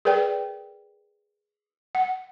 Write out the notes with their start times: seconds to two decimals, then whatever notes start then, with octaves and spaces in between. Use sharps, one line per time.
0.05 G#4 A#4 B4 D5 G5
1.95 F#5